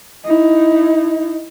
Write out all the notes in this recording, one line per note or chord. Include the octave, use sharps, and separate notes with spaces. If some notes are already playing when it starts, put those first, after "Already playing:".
D#4 E4